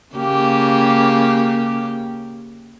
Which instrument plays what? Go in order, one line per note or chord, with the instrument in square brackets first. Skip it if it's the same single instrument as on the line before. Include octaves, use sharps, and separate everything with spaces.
[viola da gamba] C#3 A#3 G4